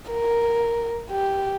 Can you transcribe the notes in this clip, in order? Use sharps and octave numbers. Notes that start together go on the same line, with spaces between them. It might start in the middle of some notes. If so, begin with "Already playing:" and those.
A#4
G4